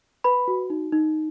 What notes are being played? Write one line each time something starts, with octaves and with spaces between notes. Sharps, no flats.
B4 B5
F#4
D#4
D#4